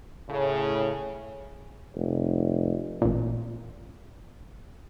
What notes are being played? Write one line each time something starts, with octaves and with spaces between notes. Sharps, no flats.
A2 C#3
F1
A1 A#2